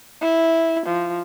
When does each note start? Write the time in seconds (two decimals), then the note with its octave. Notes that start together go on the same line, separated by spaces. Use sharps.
0.22 E4
0.86 F3